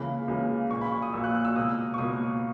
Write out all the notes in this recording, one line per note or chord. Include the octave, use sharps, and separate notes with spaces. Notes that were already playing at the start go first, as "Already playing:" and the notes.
Already playing: C#2 C#3 E3 A#3 B5
C#2 C#3 E3 A#3
A#1 A#2 A#3 C#6
B5
C#6
D#6
A#1 A#2 A#3 E6
F#6
F#6
E6
C#2 B2 A#3 D#6
C#6
C#2 B2 A#3 D#6